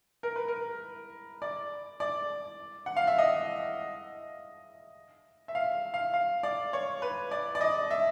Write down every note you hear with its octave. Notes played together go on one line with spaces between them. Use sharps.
A#4
B4
A#4
D5
D5
F#5
F5
E5
D#5
E5
F5
F5
F5
D5
C#5
B4
D5
D5
D#5
E5